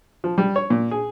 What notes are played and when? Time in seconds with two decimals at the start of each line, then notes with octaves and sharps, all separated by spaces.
0.24 F3
0.38 G3
0.56 C#5
0.70 A#2
0.91 G#4